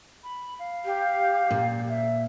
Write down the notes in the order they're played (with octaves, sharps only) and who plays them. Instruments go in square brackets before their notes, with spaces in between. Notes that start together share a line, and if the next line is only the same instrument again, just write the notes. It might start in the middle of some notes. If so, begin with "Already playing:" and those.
[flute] B5
F5
[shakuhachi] G4
[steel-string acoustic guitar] A#2
[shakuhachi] E5